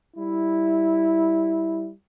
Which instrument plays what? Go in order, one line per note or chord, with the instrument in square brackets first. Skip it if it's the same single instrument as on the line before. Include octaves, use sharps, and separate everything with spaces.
[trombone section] G3 E4